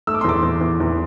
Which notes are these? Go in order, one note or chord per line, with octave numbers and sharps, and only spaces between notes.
A3 E6
D6
C6
E2 D6
E2
E2
E2